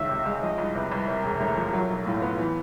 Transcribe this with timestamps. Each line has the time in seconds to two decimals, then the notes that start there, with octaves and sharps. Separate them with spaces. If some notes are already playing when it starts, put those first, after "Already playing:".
Already playing: C#2 D#3 E5
0.09 C3
0.26 G#3
0.42 F3 D#5
0.58 C2
0.75 C3 B4
0.92 C2
1.07 C3 A#4
1.24 E1
1.40 D2
1.57 F3
1.73 F#3
1.90 B1
2.06 A2 F4
2.22 B3
2.38 E3